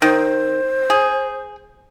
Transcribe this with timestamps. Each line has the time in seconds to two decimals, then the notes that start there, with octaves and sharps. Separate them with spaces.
0.02 D#3 C5
0.90 G#4